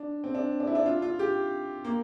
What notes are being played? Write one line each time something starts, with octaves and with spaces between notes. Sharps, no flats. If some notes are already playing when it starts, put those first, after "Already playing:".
Already playing: D4
C4
D4
D4
E4
D4
F4
F4
G4
A#3